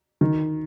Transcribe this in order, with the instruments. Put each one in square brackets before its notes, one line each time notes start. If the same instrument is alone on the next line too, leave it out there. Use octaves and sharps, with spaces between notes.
[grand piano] D#3